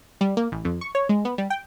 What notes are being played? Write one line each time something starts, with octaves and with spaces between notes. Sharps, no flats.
G3
A#3
A1
F2
C#6
C#5
G#3
B3
G3
G5